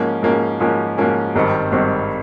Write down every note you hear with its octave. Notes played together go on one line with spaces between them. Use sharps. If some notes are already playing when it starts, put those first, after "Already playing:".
Already playing: G#2 F3 A#3 C#4
G#2 F3 A#3 C#4
G#2 F3 A#3 C#4
G#2 F3 A#3 C#4
G#1 G2 D#3 G3 C4
G#1 G2 D#3 G3 C4